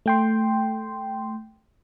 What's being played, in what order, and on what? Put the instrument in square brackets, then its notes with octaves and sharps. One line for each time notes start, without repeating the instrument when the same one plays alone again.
[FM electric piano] A3 G5 C6